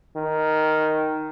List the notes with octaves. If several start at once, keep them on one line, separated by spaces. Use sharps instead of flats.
D#3